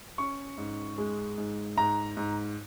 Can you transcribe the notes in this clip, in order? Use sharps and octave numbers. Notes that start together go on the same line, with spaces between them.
C#4 C#6
G#2
G#3
G#2
G#2 A#5
G#2